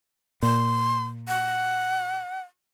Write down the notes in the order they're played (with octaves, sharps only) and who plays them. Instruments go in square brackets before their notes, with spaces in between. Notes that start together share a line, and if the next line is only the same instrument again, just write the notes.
[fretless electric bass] A#2 [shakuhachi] C6
[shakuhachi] F#5